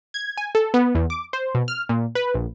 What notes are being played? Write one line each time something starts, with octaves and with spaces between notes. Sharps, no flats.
G#6
G#5
A4
B3
E2
D6
C5
B2
F6
A#2
B4
A#1